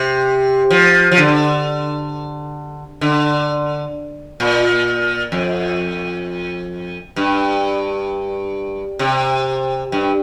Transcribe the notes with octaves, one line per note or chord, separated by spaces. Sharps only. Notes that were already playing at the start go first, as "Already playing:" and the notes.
Already playing: C3
F3
F3
D3
D3
A#2
F2
G2
C3
G2